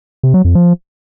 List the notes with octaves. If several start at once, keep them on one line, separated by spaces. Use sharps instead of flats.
C3
F#3
F2
F3